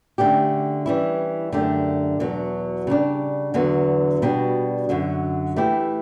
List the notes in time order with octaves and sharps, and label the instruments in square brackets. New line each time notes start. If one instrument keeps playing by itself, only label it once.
[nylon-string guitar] D3 A3 C#4 G4
E3 G3 C#4 E4
F#2 D3 A3 D4 G4
E2 B2 F#3
C#3 G3 D4
E2 D3 F#3 B3
B2 G3 D4 F#4
F#2 D3 F#3
E3 A3 E4 G4